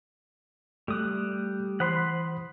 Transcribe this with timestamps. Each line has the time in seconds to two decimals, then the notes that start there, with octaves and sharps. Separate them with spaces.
0.88 G3 A3 D#6 F#6
1.80 E3 C5 F#5 B5 C6 D#6